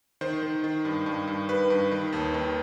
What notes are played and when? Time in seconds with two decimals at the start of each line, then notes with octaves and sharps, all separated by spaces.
0.21 D#3 C5
0.43 D#3
0.64 D#3
0.85 G2
1.06 G2
1.27 G2
1.49 G2 B4
1.70 G2
1.92 D#3
2.13 D#2
2.34 D#3